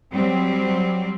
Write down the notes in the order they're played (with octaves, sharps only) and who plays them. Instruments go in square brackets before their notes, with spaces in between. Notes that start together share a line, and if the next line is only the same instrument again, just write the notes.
[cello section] F#3 G3 C4